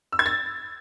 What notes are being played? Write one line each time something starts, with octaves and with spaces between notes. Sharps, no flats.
E6
G#6
A6